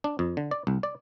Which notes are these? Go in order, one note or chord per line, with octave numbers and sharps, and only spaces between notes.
D4
F2
D3
D5
C2
D5